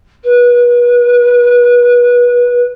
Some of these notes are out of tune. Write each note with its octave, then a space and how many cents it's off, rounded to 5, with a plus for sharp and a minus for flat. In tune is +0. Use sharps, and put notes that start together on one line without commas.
B4 -30